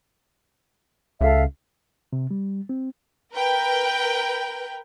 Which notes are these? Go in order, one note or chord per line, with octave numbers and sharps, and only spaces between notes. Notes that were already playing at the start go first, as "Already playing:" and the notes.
C#2 A4 E5 F5
C3
G3
C4
A#4 B4 G5